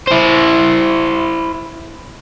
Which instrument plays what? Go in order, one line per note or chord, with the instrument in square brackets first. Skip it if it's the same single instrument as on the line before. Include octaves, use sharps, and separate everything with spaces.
[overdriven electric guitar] E4 C5